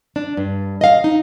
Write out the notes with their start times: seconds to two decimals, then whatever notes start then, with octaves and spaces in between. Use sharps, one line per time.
0.16 D4
0.37 G2
0.81 D#5 F5
1.04 D#4